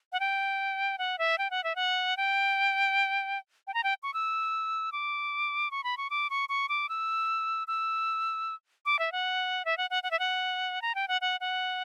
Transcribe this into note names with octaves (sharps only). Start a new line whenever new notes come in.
F#5
G5
F#5
E5
G5
F#5
E5
F#5
G5
G5
A#5
G5
C#6
E6
D6
C#6
B5
C#6
D6
C#6
C#6
D6
E6
E6
D6
E5
F#5
E5
F#5
F#5
F#5
E5
F#5
A#5
G5
F#5
F#5
F#5